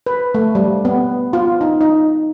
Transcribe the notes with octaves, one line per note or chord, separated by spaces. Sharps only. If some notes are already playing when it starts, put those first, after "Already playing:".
B4
A3
G3
B3
F4
D#4
D#4